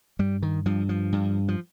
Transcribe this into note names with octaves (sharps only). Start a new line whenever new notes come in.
G2 G3
D#3
G2 F3
F3
G2
F3